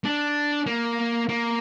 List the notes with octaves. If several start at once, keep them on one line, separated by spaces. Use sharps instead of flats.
D4
A#3
A#3